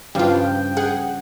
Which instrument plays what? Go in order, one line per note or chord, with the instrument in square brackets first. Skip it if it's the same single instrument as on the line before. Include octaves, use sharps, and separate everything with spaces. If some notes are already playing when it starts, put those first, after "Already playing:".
[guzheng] G2 C#3 F3 [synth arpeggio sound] G3 F4 [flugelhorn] G5
[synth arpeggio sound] G#4 [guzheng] F#5